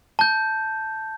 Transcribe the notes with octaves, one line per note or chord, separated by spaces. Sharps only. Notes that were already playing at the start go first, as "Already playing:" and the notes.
A5 G6